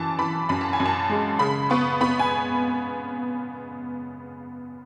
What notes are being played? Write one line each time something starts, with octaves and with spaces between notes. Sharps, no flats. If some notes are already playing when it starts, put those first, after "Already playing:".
Already playing: F#2 E3 G#5 A5
E3 B5
F#2 B5
A5
G#5
F#2
A5
G#3
C#3 B5
B3 C#6
B3 B5
G#5